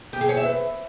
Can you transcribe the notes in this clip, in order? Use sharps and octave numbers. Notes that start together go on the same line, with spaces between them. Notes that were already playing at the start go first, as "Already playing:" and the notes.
G4
G#4
C#5
E5
B4